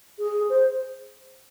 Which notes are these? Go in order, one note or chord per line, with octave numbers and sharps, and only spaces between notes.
G#4
C5